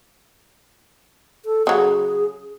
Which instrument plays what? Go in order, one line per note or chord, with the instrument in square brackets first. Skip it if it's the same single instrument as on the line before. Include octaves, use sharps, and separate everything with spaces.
[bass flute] A4
[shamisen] C#3 F#3 [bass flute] G#4